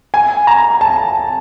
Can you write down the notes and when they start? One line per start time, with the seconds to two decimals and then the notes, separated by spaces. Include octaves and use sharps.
0.14 G#5
0.47 A#5
0.81 A5